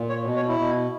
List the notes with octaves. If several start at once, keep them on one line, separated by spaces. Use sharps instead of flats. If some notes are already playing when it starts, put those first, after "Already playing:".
Already playing: A#2
C#5
B2
C#5
E4
B2